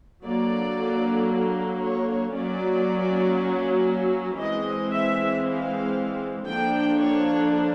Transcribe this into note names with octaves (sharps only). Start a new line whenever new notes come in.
D3 F#3 A#3 D5
C#5
F#3 A#3 C#4 D5
E3 G#3 C4 D#5
E5
F5
D3 F3 A#3 D4 G5
C#5